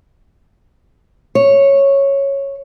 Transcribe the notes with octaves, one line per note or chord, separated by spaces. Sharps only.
C#5